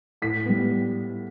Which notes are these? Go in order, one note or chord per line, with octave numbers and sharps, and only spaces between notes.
A2 B6
G3 B3